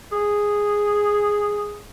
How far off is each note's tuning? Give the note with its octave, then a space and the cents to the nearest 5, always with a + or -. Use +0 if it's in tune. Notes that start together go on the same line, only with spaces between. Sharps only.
G#4 -5